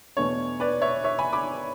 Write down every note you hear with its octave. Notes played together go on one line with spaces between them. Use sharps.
E2 B2 A3 D4 C#5
B4 D5
C#5 E5
C#5 E5
G#5 B5
B5 D6